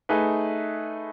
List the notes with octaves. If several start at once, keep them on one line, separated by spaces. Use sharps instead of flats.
A3 D#4 G#4 B4